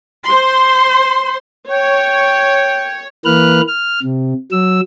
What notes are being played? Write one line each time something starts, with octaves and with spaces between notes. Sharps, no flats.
C5 C6
C#5 G5
E3 A#3 B4 F6 F#6
F6
C3
F#3 E6